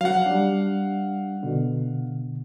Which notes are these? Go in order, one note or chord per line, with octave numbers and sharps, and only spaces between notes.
F#3 F5 F#5
G3 D4
B2 D3